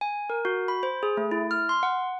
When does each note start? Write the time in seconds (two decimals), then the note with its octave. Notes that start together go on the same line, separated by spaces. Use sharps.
0.01 G#5
0.30 A#4
0.45 F#4
0.68 B5
0.83 C5
1.03 G#4
1.17 A3
1.31 E4
1.51 F6
1.69 C6
1.83 F#5